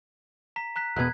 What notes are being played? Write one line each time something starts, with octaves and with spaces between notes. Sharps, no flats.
A#5 B6
A#5 F#6 B6
E1 B2 B3 F#6 G#6